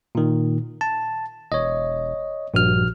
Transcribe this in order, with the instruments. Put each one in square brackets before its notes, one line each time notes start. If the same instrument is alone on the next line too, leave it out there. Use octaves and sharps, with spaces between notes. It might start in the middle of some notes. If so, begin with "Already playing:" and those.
[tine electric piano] A#2 D#3
A5
[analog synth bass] E1 [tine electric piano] C#5 D#5
[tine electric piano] A#1 F#4 F6 [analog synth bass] G2